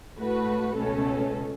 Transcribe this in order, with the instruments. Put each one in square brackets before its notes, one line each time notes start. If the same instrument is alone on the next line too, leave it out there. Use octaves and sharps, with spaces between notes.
[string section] A2 A3 F#4 B4
C#2 B2 A3 C#4 A4